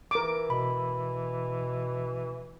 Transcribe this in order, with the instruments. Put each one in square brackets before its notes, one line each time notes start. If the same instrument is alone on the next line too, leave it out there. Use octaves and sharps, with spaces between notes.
[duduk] E3 [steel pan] A#4 D6
[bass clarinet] B2 [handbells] B5